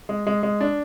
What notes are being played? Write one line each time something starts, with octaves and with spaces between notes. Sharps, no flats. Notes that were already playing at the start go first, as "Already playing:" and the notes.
G#3
G#3
G#3
D4